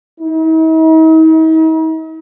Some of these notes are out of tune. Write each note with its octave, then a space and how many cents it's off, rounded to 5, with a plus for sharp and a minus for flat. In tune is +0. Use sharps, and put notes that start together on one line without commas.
D#4 +45